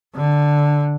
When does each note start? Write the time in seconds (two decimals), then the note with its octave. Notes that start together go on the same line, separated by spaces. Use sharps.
0.15 D3